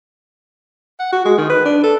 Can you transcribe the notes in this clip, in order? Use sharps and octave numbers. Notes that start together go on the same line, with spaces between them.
F#5
F#4
G#3
D#3
B4
D4
A4